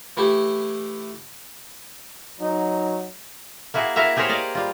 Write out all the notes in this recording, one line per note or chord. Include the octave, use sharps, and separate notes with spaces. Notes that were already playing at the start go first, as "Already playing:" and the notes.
E3 A3 E4 G4
F#3 D#4
A#3 E4 F#4 G#4
E4 F#4 A#4 E5 F5
G4 G#4 A#4 C5 C#5
D5 D#5 F5
G3 F4